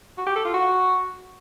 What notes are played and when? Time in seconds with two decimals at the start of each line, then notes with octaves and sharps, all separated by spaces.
0.17 F#4
0.27 G4
0.36 A4
0.45 F4
0.54 F#4